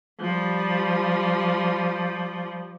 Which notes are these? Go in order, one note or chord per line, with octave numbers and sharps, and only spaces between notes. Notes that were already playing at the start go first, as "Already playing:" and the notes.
F3 G3